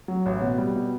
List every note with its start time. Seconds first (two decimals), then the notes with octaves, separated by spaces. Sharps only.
0.08 F#3
0.26 A1
0.41 B2
0.58 G3
0.76 B2